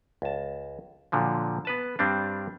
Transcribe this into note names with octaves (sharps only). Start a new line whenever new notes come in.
C#2 A5
A#2 D3 F3 F#3
B3 B4 A5
G2 G3 C4 D4